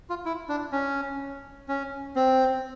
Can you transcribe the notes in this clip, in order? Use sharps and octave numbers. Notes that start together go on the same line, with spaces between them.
F4
E4
D4
C#4
C#4
C4